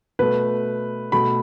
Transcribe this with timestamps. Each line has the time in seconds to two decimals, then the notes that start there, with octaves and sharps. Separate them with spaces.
0.19 B2 A3 B4
1.12 B2 A3 B5